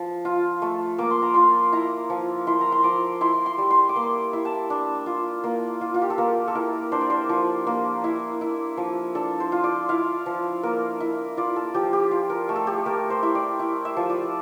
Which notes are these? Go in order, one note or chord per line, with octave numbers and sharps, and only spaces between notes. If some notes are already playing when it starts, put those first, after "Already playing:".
Already playing: F3
F4
A3
A#3 D6
C6
A#5
F4 C6
E4 A#5
F3
E4 C6
A#5
C6
F3 D6
E4 C6
C6
G3
C6
D6
A#3 C6
E4
A5
D4
F4
A#3
F4
F4
G4
A4
A#3 A#4
A4
E4 A#4
D4 C5
D5
C5
F3
A#3
E4
E4
F3
D4 A4
C5
F4
D5
E4 F5
F3
A#3 A#4
E4
F4 D5
A4
F3 G4
G4
F4
A#4
A3
A4
G4
A3 A#4
C5
E4
D5
E4
E5
F3
D5